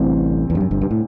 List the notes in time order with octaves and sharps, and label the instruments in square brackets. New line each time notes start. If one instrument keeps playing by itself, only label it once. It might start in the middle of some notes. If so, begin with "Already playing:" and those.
Already playing: [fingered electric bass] A1 A2 [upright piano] D2 C3 G3 C4
[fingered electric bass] E2
G2
F#2
G1 G2
G2
A2